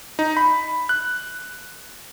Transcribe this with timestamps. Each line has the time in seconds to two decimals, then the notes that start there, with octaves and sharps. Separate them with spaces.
0.19 D#4
0.37 B5
0.89 F#6